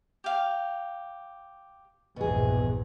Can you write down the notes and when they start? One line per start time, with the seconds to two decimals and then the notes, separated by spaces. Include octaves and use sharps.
0.24 G4 F5
2.16 A#1 E2 G2 B2 G#4